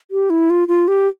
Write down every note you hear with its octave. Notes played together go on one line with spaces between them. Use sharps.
G4
E4
F4
F4
G4